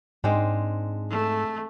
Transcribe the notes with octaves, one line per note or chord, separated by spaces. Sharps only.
G#2 G#3 C4 D4
A3